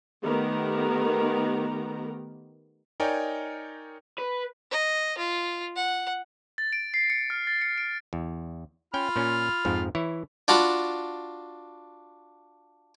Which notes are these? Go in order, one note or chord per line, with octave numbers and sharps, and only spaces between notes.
D#3 A3 B3 G4 A#4 A#5
D#4 A#4 C#5 D5 G5 G#5
B4
D#5
F4
F#5
A6
D7
C7
C#7
F6
A6
C#7
D7
E2
C#4 F4 G5 B5 F6
A#2 C#4
F2 G#2 F3
E3 E4 C#5
D4 F4 F#4 A5 B5